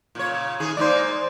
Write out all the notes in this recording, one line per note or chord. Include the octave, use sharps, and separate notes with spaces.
A#2 C#3 C#5
D#3 C#4 G#4
G#3 A#3 D#4 C5 D5